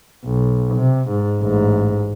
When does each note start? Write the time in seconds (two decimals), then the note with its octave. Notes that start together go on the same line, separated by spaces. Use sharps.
0.25 B1
0.75 C3
1.09 G#2
1.41 A1 G#2